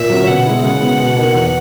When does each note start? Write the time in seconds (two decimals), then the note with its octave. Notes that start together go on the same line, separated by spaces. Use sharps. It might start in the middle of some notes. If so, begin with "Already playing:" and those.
Already playing: A#2 E5
0.10 F#3 C#4
0.27 B2 F#5
0.46 G#3 B3 E4
0.63 C#3 F#5
0.80 G#3 B3 E4
0.99 B2
1.16 A#3 D#4
1.35 E2